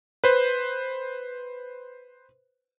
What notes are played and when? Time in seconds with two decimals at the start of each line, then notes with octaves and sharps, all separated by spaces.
0.24 B4 C5